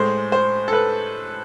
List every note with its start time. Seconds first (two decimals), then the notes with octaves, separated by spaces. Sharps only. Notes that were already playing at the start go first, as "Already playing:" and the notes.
Already playing: A2 G#3 C5
0.32 C5
0.68 A4
0.73 B4